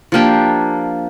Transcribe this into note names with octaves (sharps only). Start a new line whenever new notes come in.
F3 A#3 D4 G4